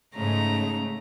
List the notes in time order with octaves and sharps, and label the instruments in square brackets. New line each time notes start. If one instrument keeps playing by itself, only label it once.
[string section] G#2 C#3 [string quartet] A3 A#5